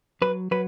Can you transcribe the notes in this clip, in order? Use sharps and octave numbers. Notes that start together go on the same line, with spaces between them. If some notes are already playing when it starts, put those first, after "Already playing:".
F#3 B4
F#3 B4